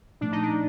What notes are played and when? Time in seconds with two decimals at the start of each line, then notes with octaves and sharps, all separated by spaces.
0.21 A#2 F3 A3 D4
0.32 D#4
0.43 D4